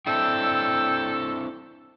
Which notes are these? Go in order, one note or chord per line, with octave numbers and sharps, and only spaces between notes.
C4 D4 E4 A4 G5 E6